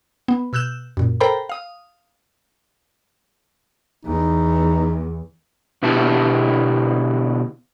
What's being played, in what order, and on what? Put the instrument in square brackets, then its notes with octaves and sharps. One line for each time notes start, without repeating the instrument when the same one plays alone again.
[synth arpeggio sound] B3
B2 E6 F#6 G6 E7
F#2 A#2
A4 A#4 C5 G5 A#5 B5
F5 D#6
[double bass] E2 [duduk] D#4
[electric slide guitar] B2 D3 B3 E4 G4 A5